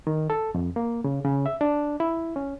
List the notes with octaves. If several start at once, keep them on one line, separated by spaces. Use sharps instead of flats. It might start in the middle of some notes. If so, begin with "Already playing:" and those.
D#3
A4
F2
A#3
C#3
C#3
E5
D4
E4
C#4